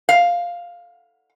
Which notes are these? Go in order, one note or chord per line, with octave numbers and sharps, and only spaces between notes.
F5